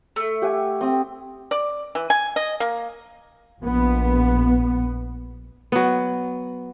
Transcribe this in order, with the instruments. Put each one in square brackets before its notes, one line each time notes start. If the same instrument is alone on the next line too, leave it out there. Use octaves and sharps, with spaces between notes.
[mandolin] A3
[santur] G4 F#5 G#5
C4 D#6
[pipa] D5
E3
G#5
D#5
A#3
[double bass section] A#1 B3
[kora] F#3 B3